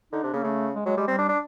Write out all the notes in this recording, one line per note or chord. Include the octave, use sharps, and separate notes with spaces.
D3 D#4
C3 D4
C#3 A#3
C#3 A3
G#3
F#3 G#3
G3 G#3
G3 C4
D4
D4